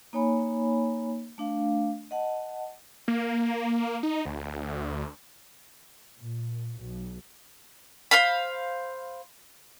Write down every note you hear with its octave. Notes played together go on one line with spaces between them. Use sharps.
A#3 D#4 C#5 G#5 B5
A3 D4 F5
D#5 F#5 A5
A#3
D#4
D2
A#2
B1
C5 F5 B5